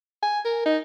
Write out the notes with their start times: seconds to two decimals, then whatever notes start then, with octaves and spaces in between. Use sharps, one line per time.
0.23 G#5
0.45 A#4
0.66 D#4